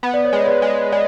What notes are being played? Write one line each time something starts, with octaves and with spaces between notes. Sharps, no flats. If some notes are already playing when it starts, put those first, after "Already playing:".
B3
D5
C#5
G#3
C#5
B4 D5
G#3
G#3 D5